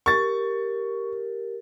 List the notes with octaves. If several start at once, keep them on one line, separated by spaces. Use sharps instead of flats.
G4 A#4 C#6 A6